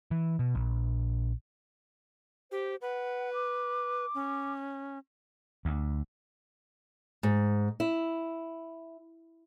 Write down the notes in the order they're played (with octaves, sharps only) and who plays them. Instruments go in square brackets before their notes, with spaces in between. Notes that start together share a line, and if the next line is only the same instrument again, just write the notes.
[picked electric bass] E3
B2
A#1
[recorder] G4 [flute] C5
[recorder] B4 [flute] F#5
[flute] D6
[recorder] C#4
[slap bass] D2
[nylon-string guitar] G#2
E4